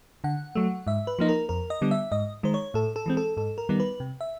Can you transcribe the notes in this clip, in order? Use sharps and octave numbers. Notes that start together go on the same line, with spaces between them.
D3 F#5
F#3 A3
G#2 E5
B4
F3 A#3 D#4
A#4
F2 A#4
D#5
D3 G3 B3
E5
G#2 D#5
D#3 G#3 C5
C#5
A2 A4
A4
E3 G#3 C4
A4
G#2 A4
A#4
D#3 G3 B3 D#4
B4
C3
E5